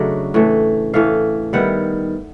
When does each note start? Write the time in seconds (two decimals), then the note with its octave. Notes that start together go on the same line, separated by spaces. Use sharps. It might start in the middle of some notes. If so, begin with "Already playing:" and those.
Already playing: C#3 F#3 A3 D4 D#5
0.34 A2 E3 A3
0.94 A2 E3 A3 F5
1.53 D#3 G3 B3 E4 F#5